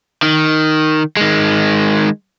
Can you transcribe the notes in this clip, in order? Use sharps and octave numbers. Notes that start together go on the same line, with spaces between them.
D#3
D#3 G#3